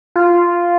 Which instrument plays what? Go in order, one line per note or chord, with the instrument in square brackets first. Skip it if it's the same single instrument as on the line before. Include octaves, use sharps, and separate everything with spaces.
[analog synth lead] F4